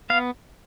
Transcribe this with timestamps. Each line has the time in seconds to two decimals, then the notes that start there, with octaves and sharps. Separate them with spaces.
0.10 B3 F5